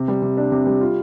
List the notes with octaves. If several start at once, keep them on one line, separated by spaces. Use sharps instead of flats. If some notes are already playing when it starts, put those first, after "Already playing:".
Already playing: C3
G3
C3
D4
C3
G3
F4